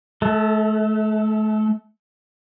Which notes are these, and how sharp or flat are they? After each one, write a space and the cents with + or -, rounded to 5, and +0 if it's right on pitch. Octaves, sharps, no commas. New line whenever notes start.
A3 -35 A4 +15